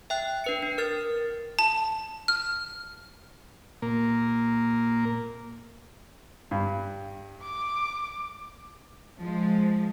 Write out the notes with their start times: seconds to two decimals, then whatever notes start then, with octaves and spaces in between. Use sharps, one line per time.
0.10 E5 G5 F#6
0.44 D4 B4 C#7
0.62 D4
0.78 A#4 F6 A6
1.59 A5
2.28 F6
3.82 A#2 A#3
6.51 G2
7.43 D6
9.20 F3 G#3